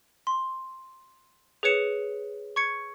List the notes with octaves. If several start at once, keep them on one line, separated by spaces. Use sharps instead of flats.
C6
G#4 B4 C#5 C#7 E7
C#6 G#6 C#7